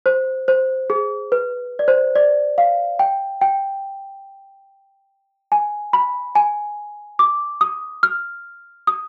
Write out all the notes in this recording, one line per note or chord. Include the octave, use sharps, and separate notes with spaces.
C5
C5
G#4
B4
D5
C5
D5
F5
G5
G5
G#5
B5
G#5
D6
D#6
F6
D#6